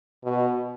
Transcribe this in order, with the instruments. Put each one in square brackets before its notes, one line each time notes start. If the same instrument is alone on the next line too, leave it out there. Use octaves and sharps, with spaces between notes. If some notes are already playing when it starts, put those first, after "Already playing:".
[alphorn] B2